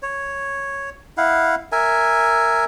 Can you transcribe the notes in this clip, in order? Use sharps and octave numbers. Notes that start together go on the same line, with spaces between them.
C#5
E4 F5 F#5
A#4 E5 G#5